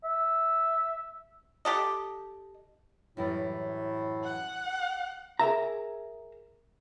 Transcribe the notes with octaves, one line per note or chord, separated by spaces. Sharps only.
E5
G4 A4 D#5
F#2 A2 E3 G3
F#5
G#4 A#4 E5 A#5